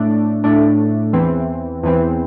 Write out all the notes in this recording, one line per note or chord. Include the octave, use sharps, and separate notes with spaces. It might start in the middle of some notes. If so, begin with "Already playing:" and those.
Already playing: A2 A3 D4
A2 A3 D4
E2 E3 C4
E2 E3 C4